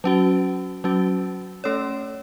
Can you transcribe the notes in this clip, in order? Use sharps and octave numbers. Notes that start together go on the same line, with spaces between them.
F#3 C#4 F#4
F#3 C#4 F#4
A3 C#4 A4 C#5